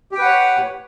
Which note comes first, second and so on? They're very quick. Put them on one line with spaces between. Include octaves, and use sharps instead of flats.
G4 G5 B4 F#5 C#5